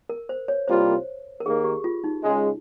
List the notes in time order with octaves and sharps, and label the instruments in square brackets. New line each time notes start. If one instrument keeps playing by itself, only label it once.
[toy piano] A#4
C5
C#5
[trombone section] C2 C3 G3 A#3 F4 [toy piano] C5
[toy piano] A#4
[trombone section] D#2 D#3 A#3 [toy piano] G#4
[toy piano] G4
F4
D#4
[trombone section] C#2 C#3 G#3